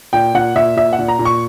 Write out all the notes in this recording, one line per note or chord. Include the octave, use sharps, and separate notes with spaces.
A#2 G5
A#2 F#5
A#2 E5
A#2 E5
F#5
A#2
A#5
A#2
C#6